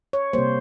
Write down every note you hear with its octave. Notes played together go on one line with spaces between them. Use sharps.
C#5
C3 G3 A#3 C5